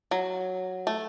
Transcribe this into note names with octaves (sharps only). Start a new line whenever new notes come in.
F#3
A3